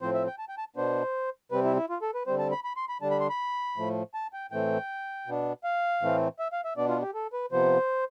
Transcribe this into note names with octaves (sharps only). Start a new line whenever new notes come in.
A2 F3 C4 C5
E5
G5
A5
G5
A5
B2 B3 D4 C5
C3 G3 C4 B4
E4
E4
F4
A4
B4
D3 G3 C4 C5
A5
B5
B5
C6
B5
D3 G3 D4 A5
B5
C6
B5
A2 F3 A3
A5
G5
A2 E3 A3 C4 G5
B2 B3 D4
F5
A2 E3 A3 C4
E5
F5
E5
B2 B3 D4 D5
F4
G4
A4
B4
C3 F3 B3 C5